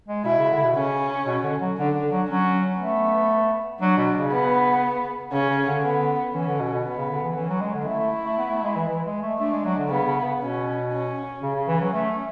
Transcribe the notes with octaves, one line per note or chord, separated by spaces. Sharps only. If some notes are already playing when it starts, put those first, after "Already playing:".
G#3
B2 E4
C#3
D3
B2
C#3 C#4
B2
D3
F#3
D3 D4
D3
F#3
F#3 C#4
A3 B3
F#3 D4
B2
C#3
B3
C#3 C#4
C#3
D3
B3
E3 C#4
D3
B2
B2
B3
C#3
D3
E3
E3 C#4
F#3
G#3
D3
A3 E4
A3
A3
B3
A3
G#3
E3
E3
G#3
A3
A3 D4
G#3
F#3
D3
C#3 B3
C#3
B2 C#4
C#4
C#3 C#4
C#3
E3
F#3
A3